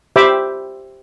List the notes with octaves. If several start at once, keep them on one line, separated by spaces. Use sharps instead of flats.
G4 C5 E5 G5 B5 D6